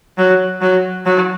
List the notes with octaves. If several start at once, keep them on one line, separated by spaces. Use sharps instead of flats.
F#3
F#3
F#3